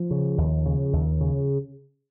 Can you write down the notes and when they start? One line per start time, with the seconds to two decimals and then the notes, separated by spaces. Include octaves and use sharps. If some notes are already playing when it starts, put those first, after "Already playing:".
Already playing: F3
0.11 C#3
0.38 D#2
0.66 C#3
0.93 D#2
1.21 C#3